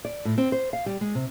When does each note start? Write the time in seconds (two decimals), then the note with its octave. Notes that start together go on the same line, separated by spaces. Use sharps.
0.05 D5
0.25 A2
0.38 C4
0.52 C5
0.73 F5
0.86 G3
1.01 G#3
1.15 C3